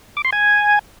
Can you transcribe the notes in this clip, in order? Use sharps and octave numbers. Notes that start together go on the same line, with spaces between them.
D6
C6
G#5